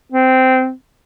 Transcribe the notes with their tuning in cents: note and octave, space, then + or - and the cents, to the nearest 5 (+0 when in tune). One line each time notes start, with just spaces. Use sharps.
C4 -15